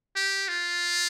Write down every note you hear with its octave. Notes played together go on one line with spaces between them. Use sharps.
G4
F4